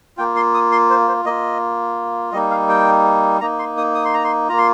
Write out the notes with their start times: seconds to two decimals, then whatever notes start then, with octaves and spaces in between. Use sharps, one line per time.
0.18 A#3 F4 G5
0.36 C6
0.54 D#6
0.72 C6
0.90 C5
1.08 C5
1.25 A#3 F4 D#5
2.33 G3 A#3 D#4 D#5
2.51 F5
2.68 G5
3.41 A#3 D#4 A#5
3.59 C6
3.77 D#6
3.95 D#6
4.05 C6
4.14 A#5
4.24 C6
4.49 A#3 F4 A#5
4.58 C6